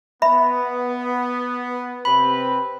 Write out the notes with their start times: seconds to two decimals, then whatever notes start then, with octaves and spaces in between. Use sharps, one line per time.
0.22 B3 E5 B5
2.05 C3 C4 B4 B5